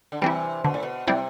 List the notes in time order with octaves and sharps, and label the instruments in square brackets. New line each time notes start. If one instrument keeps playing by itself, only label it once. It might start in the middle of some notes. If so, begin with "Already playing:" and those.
[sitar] D3
[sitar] C3 E3 [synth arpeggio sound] G3 C4 E4
[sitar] B2 [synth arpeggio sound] D3
[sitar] A2
B2
[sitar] C3 [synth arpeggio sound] G3 C4 E4